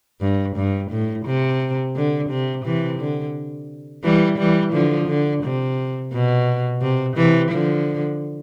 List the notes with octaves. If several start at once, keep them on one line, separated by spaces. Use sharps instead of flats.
G2
G2
A2
C3
D3
C3
C3 E3
D3
E3 G3
E3 G3
D3 F3
D3
C3
B2
C3
C3 E3
D3 F3